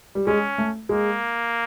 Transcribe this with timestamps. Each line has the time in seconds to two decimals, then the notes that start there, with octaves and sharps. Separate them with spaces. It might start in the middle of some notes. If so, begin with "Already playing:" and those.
0.15 G3
0.27 G#3 C#4
0.58 A3
0.89 G#3 A#3